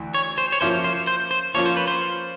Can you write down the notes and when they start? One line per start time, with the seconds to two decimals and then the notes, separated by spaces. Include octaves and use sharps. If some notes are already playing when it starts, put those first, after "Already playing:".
Already playing: D2 E3
0.14 C#5
0.38 C5
0.52 C#5
0.61 F3 A#3 C#4 E4 C5
0.84 C5
1.07 C5
1.31 C5
1.54 F3 A#3 C#4 F4 C#5
1.66 C5
1.77 B4
1.88 C5